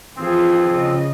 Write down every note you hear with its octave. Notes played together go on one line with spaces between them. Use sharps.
E3 F3 C4 F4 G#4
C#3 D#5